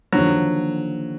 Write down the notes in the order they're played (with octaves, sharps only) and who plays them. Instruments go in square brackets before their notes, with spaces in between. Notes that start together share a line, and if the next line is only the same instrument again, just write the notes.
[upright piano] D#2 D3 F3 [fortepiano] F#3